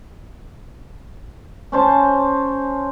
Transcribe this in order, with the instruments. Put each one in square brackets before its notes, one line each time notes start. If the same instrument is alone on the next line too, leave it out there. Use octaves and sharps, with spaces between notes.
[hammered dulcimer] C#4 C5 A5